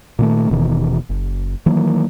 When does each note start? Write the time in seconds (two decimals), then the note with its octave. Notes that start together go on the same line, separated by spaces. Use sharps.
0.19 A#2 D#3 A3
0.50 D#1 B2 D#3 E3
1.09 F#1
1.66 D#3 E3 F#3 A#3